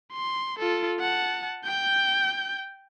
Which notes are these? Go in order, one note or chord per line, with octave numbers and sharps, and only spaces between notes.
C6
F4 A4
F#5 A5
G5 G6